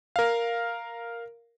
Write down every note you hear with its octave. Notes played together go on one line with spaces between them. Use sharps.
A#4 F5